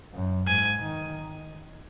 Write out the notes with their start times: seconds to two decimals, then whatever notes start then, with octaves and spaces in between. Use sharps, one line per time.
0.14 F#2
0.47 G#2 G#5
0.81 D#3